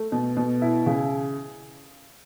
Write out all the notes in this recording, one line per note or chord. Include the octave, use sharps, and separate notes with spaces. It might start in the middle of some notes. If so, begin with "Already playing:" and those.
Already playing: A3
B2
B2
E4
C#3